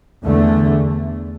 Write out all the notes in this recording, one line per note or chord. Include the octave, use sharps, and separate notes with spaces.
E2 D3 A3